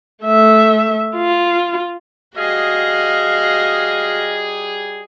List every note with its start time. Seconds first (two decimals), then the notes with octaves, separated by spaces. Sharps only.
0.24 A3 E5
1.16 F4
2.37 G3 F#4 G#4 D#5 F5